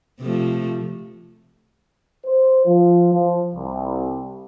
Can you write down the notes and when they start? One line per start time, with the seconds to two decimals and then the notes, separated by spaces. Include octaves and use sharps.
0.20 C3 F3 A3
2.26 C5
2.66 F3
3.13 F3
3.55 C2